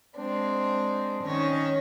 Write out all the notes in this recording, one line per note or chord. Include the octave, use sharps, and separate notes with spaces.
G#3 C4 D4
D#3 C#4 C#5